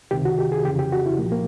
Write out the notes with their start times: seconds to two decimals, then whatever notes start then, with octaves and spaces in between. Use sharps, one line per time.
0.11 C#2 C3 D#3 G4
0.25 F#4
0.39 G4
0.52 G#4
0.65 F2 C#3 E3 G4
0.79 G4
0.92 F#4
1.06 E4
1.18 C2 A#2 F3 A#3
1.32 A#3